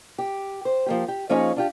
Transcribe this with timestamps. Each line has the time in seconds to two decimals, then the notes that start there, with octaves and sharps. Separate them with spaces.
0.18 G4
0.65 C5
0.86 F3 A#3 G4
1.08 G4
1.29 F3 A#3 C#4 D#4 G#4 C#5
1.56 D4 F4 G4